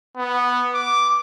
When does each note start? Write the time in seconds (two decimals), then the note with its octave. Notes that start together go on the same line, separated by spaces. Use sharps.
0.17 B3
0.74 D6